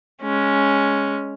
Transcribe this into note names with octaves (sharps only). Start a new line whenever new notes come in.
G#3 C#4